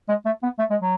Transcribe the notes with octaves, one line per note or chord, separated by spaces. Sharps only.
G#3
A3
B3
A3
G#3
F#3